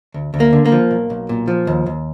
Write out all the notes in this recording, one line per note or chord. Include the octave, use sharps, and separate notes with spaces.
D2
D2
A#3
D3
A#3
F3
B1
B1
A#2
F3
D#2
D#2